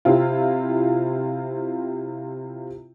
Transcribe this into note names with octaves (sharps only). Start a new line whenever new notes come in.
C3 C4 E4 F4